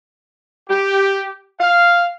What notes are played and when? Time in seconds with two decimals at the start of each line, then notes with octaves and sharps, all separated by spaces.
0.69 G4
1.61 F5